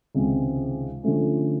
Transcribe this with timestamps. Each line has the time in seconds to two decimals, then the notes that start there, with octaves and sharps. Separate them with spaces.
0.15 C#2 C3 D#3 G#3 C4
1.03 D3 F3 A3 C#4